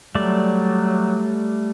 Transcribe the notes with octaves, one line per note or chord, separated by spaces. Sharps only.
F#3 G3 A3 D5